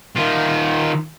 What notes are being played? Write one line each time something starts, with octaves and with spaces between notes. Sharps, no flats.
D#3 F4